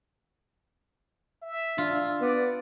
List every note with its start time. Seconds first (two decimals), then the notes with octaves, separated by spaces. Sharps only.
1.42 E5
1.78 D4 F4
2.21 B3 D5